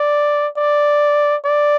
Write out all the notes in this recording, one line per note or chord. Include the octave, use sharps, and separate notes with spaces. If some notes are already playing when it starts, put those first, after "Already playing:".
Already playing: D5
D5
D5